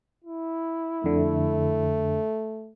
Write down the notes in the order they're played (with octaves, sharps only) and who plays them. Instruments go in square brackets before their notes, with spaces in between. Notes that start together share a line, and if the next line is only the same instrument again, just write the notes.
[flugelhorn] E4
[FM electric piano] F2 D3 [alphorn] A3